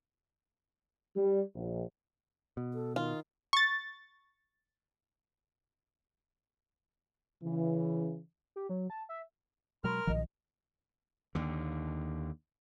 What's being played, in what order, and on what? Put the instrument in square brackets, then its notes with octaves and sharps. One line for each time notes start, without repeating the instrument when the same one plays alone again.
[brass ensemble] G3
A#1
[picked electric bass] B2
[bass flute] A4
[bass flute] D#3 [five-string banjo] F4
[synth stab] C#6 A6
[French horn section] C#3 E3
[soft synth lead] G4
F#3
A5
E5
[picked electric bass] B2 F#3 G#3 [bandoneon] A#4 F6 [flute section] B5 C6
[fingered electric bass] B1 F3 [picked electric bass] A#2 D#3 [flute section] D#5
[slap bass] D#2 D3